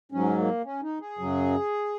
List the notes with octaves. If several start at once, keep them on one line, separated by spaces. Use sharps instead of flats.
G#2 F#3 C#4
A#3
C#4
D#4
G#4
F#2 C#3 F#3